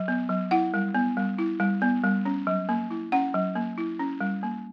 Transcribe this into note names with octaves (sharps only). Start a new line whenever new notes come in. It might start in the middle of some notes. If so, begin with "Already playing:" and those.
Already playing: F#3
B3
F#3
E4 F#5
G3
B3
G3
E4
G3
B3
G3
C#4
F#3
A#3
E4
C#4 F#5
F#3
A#3
E4
C#4
G3
A#3